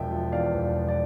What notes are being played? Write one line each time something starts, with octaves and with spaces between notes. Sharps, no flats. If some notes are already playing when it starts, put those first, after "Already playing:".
Already playing: E1 F3 E5 G5
F3
E2 D5 F5
E1
F3
D5